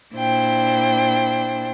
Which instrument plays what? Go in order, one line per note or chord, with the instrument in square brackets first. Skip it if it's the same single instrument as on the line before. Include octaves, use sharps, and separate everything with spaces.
[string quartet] A#2 D4 E4 C5 G5